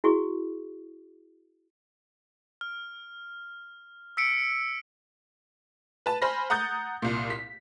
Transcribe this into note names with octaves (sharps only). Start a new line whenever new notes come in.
E4 F#4 G#4 C#6
F6
E6 B6 C#7 D7
B4 A5
C5 G#5 B5 F6 A#6
F#5 A#5 D#6 G6 A6
C2 A#2
B6